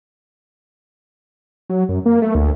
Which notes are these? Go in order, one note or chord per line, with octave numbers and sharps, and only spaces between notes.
F#3
F#2
A#3
A3
D2